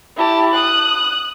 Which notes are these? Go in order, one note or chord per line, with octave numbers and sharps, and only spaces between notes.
E4 G4 A5
D#6 F#6